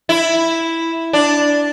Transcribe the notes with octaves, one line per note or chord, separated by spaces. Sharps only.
E4
D4